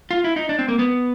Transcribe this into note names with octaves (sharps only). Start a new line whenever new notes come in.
F4
E4
D#4
D4
C4
A#3
B3